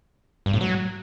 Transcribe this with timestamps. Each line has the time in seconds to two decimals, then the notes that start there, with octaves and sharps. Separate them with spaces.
0.46 G2
0.53 A2
0.61 F#3